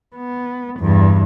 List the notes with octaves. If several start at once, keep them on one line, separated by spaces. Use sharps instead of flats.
B3
E2 G2